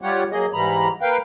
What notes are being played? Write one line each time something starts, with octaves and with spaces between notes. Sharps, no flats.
G3 F4 G4 C#5 F#5
F#3 A#3 G#4 D#5
G#2 E3 G3 A#5 B5
A#3 B4 F5 G5